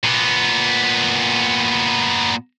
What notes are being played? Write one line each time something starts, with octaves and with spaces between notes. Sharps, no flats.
A#2 B3